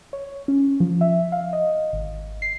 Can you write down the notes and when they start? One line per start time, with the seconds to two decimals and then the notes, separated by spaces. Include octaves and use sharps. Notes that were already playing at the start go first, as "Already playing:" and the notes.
0.13 C#5
0.48 C#4
0.80 F3
1.01 E5
1.32 F5
1.53 D#5
1.93 G#1
2.42 C7